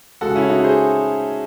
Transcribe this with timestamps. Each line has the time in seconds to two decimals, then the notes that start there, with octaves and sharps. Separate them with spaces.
0.21 C#3 G#3 F#4 A4
0.35 C#4 E4
0.49 D#4 F#4
0.64 G#4 C5